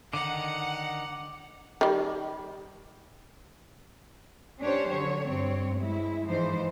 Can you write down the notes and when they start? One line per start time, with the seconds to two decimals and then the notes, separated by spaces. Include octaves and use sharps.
0.13 D3 D#3 D#4 F#5 D6
1.81 D#3 G3
4.61 C#4 D4 G4 C5 C#5
4.90 D3 F#3 C#5
5.27 G2 C4 C#5
5.79 G#3 E4
6.27 G#2 E3 F3 D#4 C5